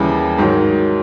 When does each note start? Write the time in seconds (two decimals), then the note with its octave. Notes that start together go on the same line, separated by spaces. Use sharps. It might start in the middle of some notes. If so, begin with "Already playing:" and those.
Already playing: D#2 C#3 E3 G3
0.38 G#2 D#3 F#3